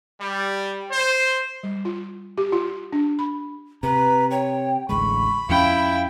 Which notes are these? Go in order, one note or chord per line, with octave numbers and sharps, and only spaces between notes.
G3
C5
G3
F4
G4
F4
D4
B5
C3 B4 A#5
C#5 G5
A1 D2 G#3 B5 C#6
F2 F3 C#4 E4 F5 G5